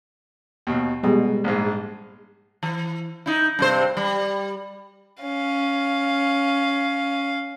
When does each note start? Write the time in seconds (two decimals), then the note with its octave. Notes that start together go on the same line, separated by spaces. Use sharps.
0.67 D#2 B2
1.03 B2 G3 G#3 B3
1.44 A#1 G#2
2.63 E3
3.26 D#4 E4
3.59 G2 C3 C5
3.97 G3
5.23 C#4 F5